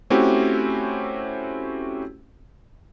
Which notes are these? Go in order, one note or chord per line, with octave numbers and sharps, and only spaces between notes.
A3 C4 C#4 E4 F#4 G4